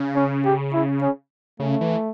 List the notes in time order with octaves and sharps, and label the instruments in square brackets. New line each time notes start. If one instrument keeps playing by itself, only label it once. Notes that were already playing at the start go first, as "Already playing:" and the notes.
Already playing: [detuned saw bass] C#3
[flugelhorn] C#4
G4
E4
C#4
[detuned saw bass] C#3 [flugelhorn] A3
[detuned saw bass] E3